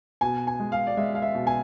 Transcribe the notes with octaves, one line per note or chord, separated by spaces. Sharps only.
B2 G#5
G#5
G#3
F5
D5
G#3 E5
F5
E5
B2
G#5